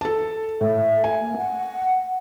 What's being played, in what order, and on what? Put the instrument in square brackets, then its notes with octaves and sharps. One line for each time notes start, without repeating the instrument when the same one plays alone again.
[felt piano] A4 A5
[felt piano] A2 [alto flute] E5
[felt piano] G#5
[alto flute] A#3
F#5